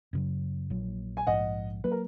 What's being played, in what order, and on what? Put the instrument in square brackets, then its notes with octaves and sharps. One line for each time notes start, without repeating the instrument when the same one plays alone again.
[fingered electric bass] F#2 C#3 F#3
A#1 A#2 F#3
[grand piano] G#5
[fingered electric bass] A#1 G#2 F3 [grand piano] D#5 F#5
[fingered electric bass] F#3 A#3 [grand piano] B4
[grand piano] A#4